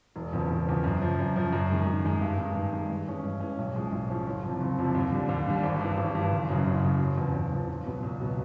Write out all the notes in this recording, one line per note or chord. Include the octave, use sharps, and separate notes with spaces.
E1
E2 C#3 F3
E1
E2 C#3 F3
F#2
C#3 F3
F#2
C#3 F3
F#2
D#3 G#3
F#2
D#3 G#3
G2
D#3 G#3
G2
D#3 G#3
G2
E3 G#3 C#4
G2
E3 G#3 C#4
B1
A2 F3 G#3 C#4
B1
A2 F3 G#3 C#4
F#1
F2 C3 F3
F#1
F2 C3 F3
D#2
D3 G3
D#2
D3 G3
G#1
G2 E3
G#1
G2 E3
F#1
F#2 C#3 F#3
F#1
F#2 C#3 F#3
F#1
E2 C#3 F3
F#1
E2 C#3 F3
C#2
B2 F#3 B3
C#2
B2 F#3 B3